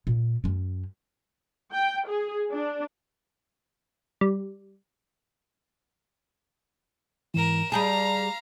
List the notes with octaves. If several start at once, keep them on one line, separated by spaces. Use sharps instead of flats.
A#2
F#2 C#4
G5
G#4
D4
G3
G#2 E3 A#4 E7
G3 G4 G#4 F5 A5 A#5